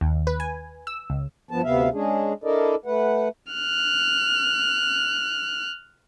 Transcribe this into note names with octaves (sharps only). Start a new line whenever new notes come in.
D#2
B4
G#5
E6
C#2
G2 F3 B3 A5
D2 C3 B3 E5 F5
G#3 C#4 D4 G#4
D4 E4 A4 A#4 D5 D#5
A3 B4 F#5
F6 F#6